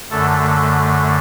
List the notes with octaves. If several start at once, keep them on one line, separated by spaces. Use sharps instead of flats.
F#2 D3 A3 A4